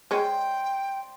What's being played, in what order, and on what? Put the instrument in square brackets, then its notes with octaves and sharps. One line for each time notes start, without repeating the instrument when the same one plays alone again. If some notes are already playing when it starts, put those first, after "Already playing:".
[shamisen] G#3 C#4 [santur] C5 D5 C6 [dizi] G5